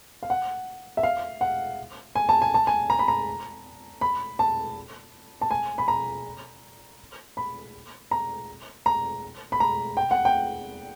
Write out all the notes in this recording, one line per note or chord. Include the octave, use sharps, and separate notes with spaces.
F5
F#5
E5
F5
F#5
G#5
A5
G#5
A5
G#5
A#5
B5
A#5
B5
A5
A5
G#5
B5
A#5
B5
A#5
A#5
B5
A#5
G5
F#5
G5